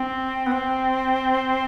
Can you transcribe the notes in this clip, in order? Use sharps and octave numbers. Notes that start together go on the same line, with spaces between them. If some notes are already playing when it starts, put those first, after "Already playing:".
Already playing: C4
B3
C4